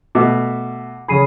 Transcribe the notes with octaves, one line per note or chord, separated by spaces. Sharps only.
B2 A3 F#5 D6
C#3 F#3 G#4 B5 C7 D#7